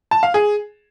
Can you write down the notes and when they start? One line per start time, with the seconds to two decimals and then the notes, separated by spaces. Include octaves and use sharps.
0.11 A5
0.23 F5
0.34 G#4